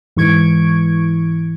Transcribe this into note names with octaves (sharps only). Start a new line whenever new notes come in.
G#2 E3 C#6 G#6 D7